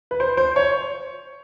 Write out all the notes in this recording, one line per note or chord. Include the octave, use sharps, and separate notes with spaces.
B4
C5
C5
C#5